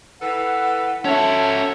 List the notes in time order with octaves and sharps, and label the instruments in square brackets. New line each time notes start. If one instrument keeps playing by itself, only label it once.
[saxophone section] E3 A4 B4 [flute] F#5
[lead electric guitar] C#4 E5 [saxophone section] F#4 A4 C#5 [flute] A5